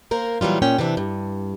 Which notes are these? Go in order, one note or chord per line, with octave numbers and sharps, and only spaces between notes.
A#3 A#4 C5
A#2 E3 F#3 G3 F4
A#2 C#4 G5
C3 E3 D4
G2